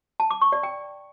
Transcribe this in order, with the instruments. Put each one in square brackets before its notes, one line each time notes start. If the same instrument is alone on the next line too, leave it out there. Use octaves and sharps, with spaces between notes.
[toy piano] A5
D6
C#6
D5
G5